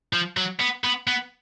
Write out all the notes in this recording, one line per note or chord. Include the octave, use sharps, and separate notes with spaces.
F3
F#3
B3
B3
B3